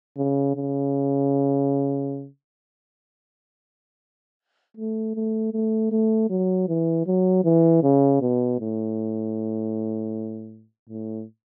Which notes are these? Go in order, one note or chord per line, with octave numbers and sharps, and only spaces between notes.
C#3
C#3
A3
A3
A3
A3
F#3
E3
F#3
E3
C#3
B2
A2
A2